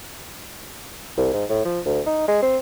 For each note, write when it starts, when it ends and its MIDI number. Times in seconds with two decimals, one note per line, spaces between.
1.17 1.33 36
1.34 1.44 44
1.50 1.63 45
1.65 1.80 53
1.85 2.00 38
2.06 2.23 63
2.28 2.41 56
2.42 2.58 60